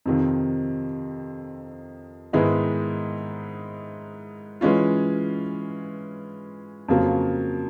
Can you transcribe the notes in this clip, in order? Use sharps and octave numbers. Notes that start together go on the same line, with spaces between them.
F2 C3 D#3
G#2 D#3 G#3 B3 E4
E3 G#3 C#4 F4
F2 C#3 F#3 A#3